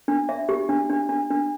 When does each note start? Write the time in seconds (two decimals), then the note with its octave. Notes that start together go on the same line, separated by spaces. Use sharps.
0.08 D4
0.29 E5
0.49 G4
0.69 D4
0.89 D4
1.09 D4
1.30 D4